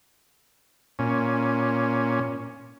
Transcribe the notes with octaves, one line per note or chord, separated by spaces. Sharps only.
A#2 C#4